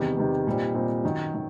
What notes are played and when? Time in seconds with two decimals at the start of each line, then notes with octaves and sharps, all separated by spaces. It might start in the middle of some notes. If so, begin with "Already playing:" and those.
Already playing: E2 C3 D#3 G3
0.17 E2 C3 D#3 G3
0.47 A#2 G3 C4 D#4
0.75 A#2 G3 C4 D#4
1.03 F#2 D#3 F#3
1.34 D#3